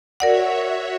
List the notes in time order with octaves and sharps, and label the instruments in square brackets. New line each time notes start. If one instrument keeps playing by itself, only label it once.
[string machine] F#4 C#5 E5 [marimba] A#4 D5 F#5